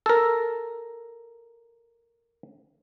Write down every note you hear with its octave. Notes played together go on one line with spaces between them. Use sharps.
A4 A#4